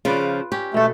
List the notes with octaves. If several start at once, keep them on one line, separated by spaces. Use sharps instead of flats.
C#3 F3 F4 B4 D5
C#4 G4
B2 A3 A4